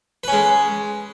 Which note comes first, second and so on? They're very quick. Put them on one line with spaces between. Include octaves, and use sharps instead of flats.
B4 C#4 G#3